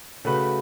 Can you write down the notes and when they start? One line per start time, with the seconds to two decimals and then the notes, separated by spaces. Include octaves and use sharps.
0.25 C#3 A3 F#4 B4